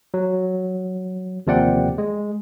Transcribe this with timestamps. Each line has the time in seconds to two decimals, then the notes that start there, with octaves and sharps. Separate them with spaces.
0.14 F#3
1.47 D#2 C3 F3 D5 F#5 G5
1.98 G#3